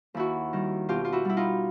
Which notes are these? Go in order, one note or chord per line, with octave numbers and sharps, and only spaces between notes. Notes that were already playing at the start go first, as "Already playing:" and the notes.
D#2 E4 F#4
D#3 G3
B2 F4 G4
F4
E4 F#4
G3 E4
D#4 F4